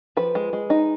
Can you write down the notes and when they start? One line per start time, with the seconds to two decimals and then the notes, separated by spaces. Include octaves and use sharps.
0.17 F3 B4
0.35 G#3
0.53 G#3
0.70 D#4